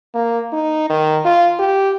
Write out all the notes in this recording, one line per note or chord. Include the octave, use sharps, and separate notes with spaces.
A#3
D#4
D#3
F4
G4